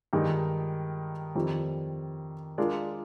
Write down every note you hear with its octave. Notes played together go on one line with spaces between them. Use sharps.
G2 D#3 G#3 D#4
F2 D#3 G3
G#3 D4 F4 A#4 D5